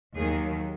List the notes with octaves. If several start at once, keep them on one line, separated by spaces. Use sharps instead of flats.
D#2 D#3 F#3 G#4